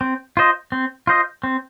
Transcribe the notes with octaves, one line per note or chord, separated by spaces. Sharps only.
C4
F4 C5 D#5
C4
F4 C5 D#5
C4